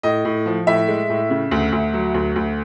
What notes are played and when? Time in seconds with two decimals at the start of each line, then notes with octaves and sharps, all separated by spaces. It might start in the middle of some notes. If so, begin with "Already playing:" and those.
0.03 A2 D#5
0.25 A2
0.46 F3
0.67 A2 E5
0.88 G#3
1.10 A2
1.30 C#3
1.51 D2
1.72 D2
1.93 F#3
2.14 D2
2.36 D2